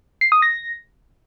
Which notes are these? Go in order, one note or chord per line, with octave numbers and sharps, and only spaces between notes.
C7
D#6
A#6